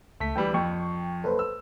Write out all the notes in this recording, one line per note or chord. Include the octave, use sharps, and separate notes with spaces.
C#2 A3 B6
D2 E3 G3 G5
F2 G5 C#6
F#1 A4 B4 C5
E6